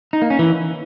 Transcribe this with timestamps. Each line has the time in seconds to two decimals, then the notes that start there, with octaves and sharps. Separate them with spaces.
0.13 D#4
0.22 A#3
0.30 C#4
0.39 E3